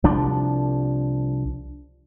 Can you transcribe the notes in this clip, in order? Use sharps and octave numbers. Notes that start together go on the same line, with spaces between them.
C2 F3 D4